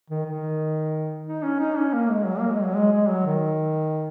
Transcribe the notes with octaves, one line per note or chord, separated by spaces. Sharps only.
D#3
D#3
D#4
C#4
D#4
C#4
A#3
G#3
F#3
A#3
G#3
F#3
G#3
G#3
F#3
D#3